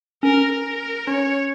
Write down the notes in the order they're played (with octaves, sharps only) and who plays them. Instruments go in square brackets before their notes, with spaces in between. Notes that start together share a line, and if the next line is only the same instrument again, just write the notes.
[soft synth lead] C#4 [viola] A#4
[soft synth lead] C#4
[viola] A#4
[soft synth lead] C#4 [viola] C#5